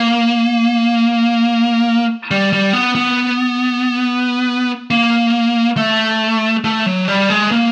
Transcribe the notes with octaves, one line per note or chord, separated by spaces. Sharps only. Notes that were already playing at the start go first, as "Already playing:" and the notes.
Already playing: A#3
G3
G3
B3
B3
A#3
A3
A3
F#3
G3
G#3
A#3